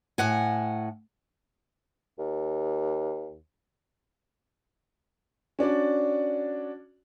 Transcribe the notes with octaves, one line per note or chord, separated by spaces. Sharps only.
A2 F#5 G#5
D#2
C#4 D4 F#4 D5